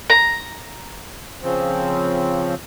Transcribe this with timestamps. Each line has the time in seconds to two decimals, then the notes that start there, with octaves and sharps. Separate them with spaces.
0.10 A#5
1.43 C#3 F3 C4